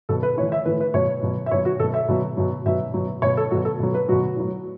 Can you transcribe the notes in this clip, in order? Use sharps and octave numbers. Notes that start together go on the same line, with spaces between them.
B2 F#3 A4
B4
A2 E3 C#5
E5
A2 E3 B4
B4
B2 F#3 C#5
B2 F#3
E5
B2 F#3 C#5
F#4
B2 F#3 A4
E5
B2 F#3
B2 F#3
B2 F#3 E5
B2 F#3
B2 F#3 C#5
A4
B2 F#3 F#4
A4
B2 F#3
B4
B2 F#3 F#4
A2 F#3